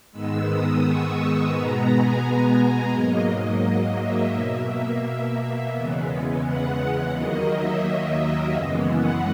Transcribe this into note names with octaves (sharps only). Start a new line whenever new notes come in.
G#2 D#3 G#3 B3 E6
D#6
C#6
B2 G#3 B3 A#5
G#5
G#2 F#3 A#3 D#5
D#5
E5
B2 A#3 E5
E2 C#3 E3 G#3 B3
F#5
F#5
D#2 D#3 F#3 A#3 D#5
E5
F#2 C#3 E3 G#3 B3
F#5